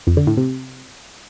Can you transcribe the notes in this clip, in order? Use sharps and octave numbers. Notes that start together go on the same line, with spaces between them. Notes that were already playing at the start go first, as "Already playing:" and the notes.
F2
D3
A2
C3